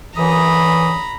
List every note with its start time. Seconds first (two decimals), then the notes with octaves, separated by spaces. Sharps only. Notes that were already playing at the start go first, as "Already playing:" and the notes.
0.16 F#2 D3 E3 A#5 B5 D#6